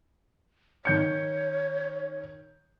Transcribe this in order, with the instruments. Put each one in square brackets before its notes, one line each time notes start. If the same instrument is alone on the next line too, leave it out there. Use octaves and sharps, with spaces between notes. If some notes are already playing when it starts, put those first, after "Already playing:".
[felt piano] D#3 G6 C#7 [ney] C#5